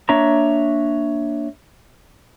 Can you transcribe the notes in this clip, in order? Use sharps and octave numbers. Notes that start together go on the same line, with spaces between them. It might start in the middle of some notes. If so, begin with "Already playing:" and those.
A#3 D4 C#5 E5 A#5